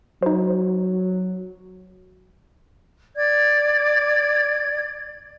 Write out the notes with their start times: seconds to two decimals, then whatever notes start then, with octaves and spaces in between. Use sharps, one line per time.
0.23 F#3 D#4 C5
3.16 D5 G#6